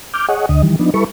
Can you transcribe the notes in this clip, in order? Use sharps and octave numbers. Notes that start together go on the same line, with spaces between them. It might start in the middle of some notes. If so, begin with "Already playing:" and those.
D6 F6 G6
G#4 C#5 D#5 F#5
D2 D3 D#5
D#3 E3 G3
F3 B3 D4 D#4
G3 E4 A4 B4 C#6